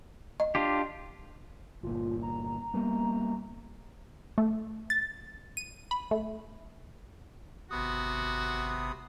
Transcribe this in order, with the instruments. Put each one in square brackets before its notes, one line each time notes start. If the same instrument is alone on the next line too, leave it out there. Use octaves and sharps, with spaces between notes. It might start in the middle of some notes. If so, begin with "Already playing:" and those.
[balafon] D#5
[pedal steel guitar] D4 F4 G4
[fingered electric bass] G1 A#2 [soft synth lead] F4
[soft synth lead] A#5
[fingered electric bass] G3 A#3 B3
[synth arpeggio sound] A3
A6
D#7
B5
A3
[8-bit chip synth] G#1 B5 D#6 [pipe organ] C3 B3 [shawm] F#4